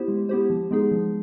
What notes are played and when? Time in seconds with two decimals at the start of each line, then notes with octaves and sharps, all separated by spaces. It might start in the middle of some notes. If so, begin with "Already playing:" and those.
Already playing: B3 E4 G4 C5
0.08 G#3
0.29 B3 E4 G4 C5
0.50 F3
0.71 G#3 B3 D#4 G#4
0.91 F3